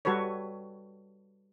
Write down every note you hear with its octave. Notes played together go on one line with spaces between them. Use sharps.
G3 F#4 A4 B4 C#5